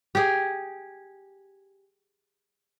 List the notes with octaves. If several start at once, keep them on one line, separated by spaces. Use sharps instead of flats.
G4 G#4